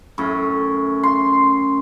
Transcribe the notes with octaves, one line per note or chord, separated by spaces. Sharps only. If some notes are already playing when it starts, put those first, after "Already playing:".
F#2 A2
C6